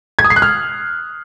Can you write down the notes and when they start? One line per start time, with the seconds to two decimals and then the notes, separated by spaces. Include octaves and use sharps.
0.19 G#6
0.24 D#6
0.30 C7
0.36 F#6
0.42 F6